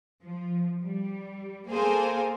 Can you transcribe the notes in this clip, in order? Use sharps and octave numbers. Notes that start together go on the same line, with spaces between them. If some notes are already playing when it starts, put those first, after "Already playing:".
F3
G3
A#3 G#4 A4 C5 F5 G#5